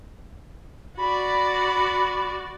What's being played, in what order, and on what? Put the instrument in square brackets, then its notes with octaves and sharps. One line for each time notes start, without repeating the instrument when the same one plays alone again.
[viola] F#4 D5 [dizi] B5